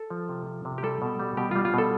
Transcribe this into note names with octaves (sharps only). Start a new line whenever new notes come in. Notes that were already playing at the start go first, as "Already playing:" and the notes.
Already playing: A4
F3
C3
F3
C3
G4
G3 A4
B2
G3
B2 G4
G3 F4
F4
B2 A4